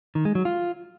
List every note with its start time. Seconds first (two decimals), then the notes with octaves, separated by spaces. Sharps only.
0.15 D#3
0.25 G#3
0.35 F#3
0.45 F4